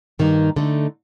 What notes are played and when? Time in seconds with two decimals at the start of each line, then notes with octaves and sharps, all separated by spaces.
0.19 G2 D#3 A#3 D#4
0.56 D3 A3 D#4